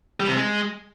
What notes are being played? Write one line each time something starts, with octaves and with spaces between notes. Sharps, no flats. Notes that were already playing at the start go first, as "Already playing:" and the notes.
G3
C3
G#3